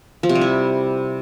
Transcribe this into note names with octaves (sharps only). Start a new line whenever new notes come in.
F3
C3
G3
E4